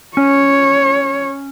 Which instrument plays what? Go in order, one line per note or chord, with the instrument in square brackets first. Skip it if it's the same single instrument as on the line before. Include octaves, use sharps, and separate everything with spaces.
[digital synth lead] C#4 [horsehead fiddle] C#5